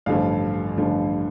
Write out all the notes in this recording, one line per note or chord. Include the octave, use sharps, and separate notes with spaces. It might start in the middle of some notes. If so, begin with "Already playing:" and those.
A1 G2 D3 F3 F5
A1 G2 D3 F3